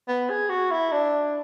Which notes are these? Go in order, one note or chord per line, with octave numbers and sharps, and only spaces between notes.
B3
G#4
F#4
E4
D4